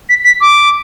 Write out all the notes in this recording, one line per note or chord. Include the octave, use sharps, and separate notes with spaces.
B6
B6
D6